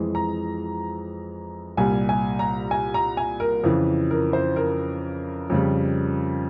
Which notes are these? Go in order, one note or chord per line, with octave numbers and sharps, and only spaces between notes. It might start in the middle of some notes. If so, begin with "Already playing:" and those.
Already playing: F2 E3 G#3
A#5
C2 A#2 G3 G#5
G#5
A#5
G#5
A#5
G#5
A#4
F2 C#3 E3
A#4
C5
A#4
F2 C#3 G3